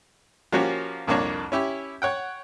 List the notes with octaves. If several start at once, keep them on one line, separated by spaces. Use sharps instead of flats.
F3 A#3 C#4 F#4 G4
C2 F2 A#3 D4 C#5 A5
C#4 E4 G4
C#5 F#5 G5